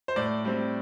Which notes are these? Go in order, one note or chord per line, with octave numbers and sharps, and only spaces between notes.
C5
A2 D5
G3 C4